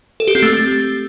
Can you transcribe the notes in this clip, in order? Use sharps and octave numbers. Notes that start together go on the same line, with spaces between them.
A4
G4
C4
A3